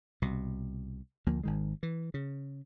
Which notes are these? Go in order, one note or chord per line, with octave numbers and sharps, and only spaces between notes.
C2 B2
D2 F3 A#3
G#1 D#3 G#3
E3
C#3